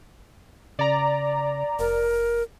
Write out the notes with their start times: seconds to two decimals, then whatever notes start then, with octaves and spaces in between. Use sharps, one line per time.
0.79 C#3 D5 A#5
1.79 F1 A#4